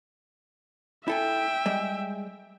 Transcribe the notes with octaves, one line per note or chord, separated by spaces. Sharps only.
E4 A4 E5 G5 G#5
G3 G#3